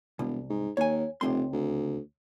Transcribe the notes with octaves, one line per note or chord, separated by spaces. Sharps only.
E1 C2
G#2
D#2 C#5 G#5
F1 C#2 C4 C6
D2